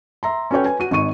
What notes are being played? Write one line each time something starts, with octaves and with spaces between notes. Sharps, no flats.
E5 A#5 C6
C#4 F#4 A4 B4 C#5 G5
B4 G#5
F#4 D#7
G#1 D#4 C#6 D#7